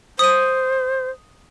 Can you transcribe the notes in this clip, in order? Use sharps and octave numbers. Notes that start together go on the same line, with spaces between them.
C5 D#6 D#7